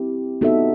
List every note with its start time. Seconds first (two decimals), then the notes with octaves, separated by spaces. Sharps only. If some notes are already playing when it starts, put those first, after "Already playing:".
Already playing: C4 E4 G4
0.41 B3 D#4 F#4 A4 E5